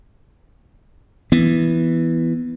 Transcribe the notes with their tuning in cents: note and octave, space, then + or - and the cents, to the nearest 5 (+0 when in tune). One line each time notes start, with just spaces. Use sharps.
E3 +0 B3 +0